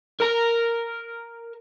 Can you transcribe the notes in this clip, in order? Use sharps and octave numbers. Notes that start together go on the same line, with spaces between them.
A#4 A#5